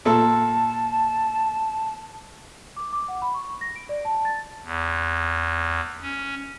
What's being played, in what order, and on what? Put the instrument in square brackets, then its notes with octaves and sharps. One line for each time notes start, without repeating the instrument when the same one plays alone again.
[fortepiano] A#2 A4 E6 [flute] A5
[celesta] D6
D6
F#5
B5
C#6
A#6
D7
D5
A5
A6
[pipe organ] E2
C#4